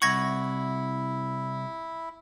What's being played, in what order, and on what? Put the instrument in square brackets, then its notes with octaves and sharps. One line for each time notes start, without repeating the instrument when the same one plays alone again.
[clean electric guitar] C2 F#5 [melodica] E4 [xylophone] C#6 G#6 A#6